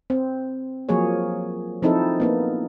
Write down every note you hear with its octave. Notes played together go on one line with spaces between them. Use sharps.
C4
F3 F#3 A#3 G#4 C#5
F3 C4 D#4 E4 A4
A#3 B3 D#4